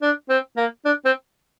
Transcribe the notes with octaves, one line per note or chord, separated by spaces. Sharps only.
D4
C4
A#3
D4
C4